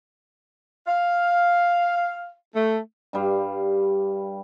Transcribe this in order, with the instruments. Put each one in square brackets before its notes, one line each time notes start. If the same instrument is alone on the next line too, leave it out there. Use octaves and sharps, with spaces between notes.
[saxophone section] F5
A3
[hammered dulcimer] G2 G3 F5